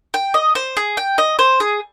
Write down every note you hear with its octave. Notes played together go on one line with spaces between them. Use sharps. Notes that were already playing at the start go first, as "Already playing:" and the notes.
G5
D#5
C5
G#4
G5
D#5
C5
G#4